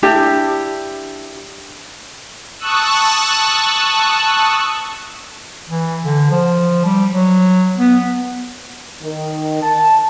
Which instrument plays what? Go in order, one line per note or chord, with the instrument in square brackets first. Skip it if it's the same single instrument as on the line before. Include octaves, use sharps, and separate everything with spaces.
[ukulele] D4 E4 G4
[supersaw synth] A5 C#6 D#6 E6 F#6
[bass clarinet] E3
D3
F3
G3
F#3
B3
[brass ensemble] D#3
A5